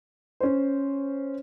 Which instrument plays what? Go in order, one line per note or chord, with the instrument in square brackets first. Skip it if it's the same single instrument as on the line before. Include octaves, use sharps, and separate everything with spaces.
[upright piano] C#4 C5